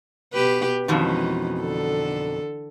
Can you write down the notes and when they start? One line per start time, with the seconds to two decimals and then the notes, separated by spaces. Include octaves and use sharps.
0.33 B2 G4 B4
0.88 F2 B2 D#3 E3 G#3 C#4
1.60 D3 A4